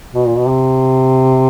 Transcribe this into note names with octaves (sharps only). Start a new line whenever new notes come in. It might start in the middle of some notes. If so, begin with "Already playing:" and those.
B2
A#2
B2
C3